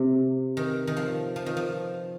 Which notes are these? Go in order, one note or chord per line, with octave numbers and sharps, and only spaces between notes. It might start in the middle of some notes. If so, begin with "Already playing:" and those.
Already playing: C3
D#3
D#3
F3
F3
D#3
F3